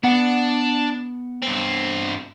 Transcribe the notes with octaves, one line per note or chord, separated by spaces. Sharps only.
B3 D4 F#5
G2 C4